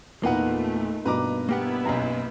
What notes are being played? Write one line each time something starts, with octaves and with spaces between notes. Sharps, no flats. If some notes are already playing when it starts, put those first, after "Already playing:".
E2 A#2 A3 A#3 D#4 F4 B4 F#5
G2 B2 B4 A#5 D6
A#3 B3 E4 G4 F#5
B1 F#2 A#5